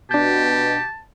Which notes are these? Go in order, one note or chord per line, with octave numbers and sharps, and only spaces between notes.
B2 D4 G4 A5 G6